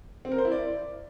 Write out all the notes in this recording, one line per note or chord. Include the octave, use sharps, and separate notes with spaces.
C4
A#4
C5
E4
D5